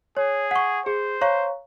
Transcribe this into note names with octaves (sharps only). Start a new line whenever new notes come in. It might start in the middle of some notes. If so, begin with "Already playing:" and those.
G#4 C#5
F#5 C#6
G#4 C5
C#5 F5 A#5 C#6